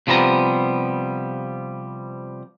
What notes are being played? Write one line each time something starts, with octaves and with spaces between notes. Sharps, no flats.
C3 F3 G3 B3 A#5